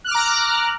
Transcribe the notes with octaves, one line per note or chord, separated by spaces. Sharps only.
A#5 D6 F6 F#6